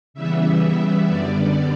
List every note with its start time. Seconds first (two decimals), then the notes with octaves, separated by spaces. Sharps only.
0.14 C#3 E3 G3 B3 E5
1.07 F#2 D3 G3 B3 D5